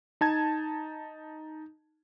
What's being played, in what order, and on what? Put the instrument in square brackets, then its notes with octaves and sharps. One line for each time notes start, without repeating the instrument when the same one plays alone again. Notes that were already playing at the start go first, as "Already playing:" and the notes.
[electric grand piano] D#4 A5 G#6